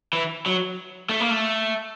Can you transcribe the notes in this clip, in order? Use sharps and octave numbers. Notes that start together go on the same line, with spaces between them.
E3
F#3
A3
A#3
A3